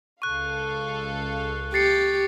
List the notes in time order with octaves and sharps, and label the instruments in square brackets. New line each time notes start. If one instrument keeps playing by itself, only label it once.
[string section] C#2 A4 F5 [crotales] C#6 F#6
[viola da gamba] G4 [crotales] A6 C7 C#7